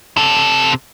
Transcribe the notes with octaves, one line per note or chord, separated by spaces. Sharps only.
C3 A4